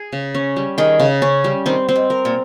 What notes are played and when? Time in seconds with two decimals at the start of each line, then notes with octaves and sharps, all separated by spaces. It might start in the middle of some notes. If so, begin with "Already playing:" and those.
Already playing: G#4
0.13 C#3
0.35 C#4
0.56 G3
0.78 D#3 G#4
1.00 C#3
1.22 C#4
1.44 G3
1.66 D#3 C4
1.89 C4
1.96 G#2
2.10 A#4
2.25 A#2